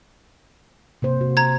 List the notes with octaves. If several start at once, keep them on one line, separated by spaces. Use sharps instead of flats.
C3 A#3 C5
F#4
A#5 G#6